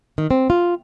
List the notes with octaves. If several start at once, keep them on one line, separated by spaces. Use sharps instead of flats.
D#3
C4
F4